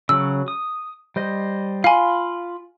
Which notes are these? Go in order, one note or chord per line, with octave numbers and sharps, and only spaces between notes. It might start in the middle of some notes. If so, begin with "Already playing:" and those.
C#3 F#3 E6
D#6
G3 C5 D#5
F4 F5 G#5 B5 C6